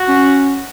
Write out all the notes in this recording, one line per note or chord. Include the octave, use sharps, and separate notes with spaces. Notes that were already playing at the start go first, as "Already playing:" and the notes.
Already playing: F#4
C#4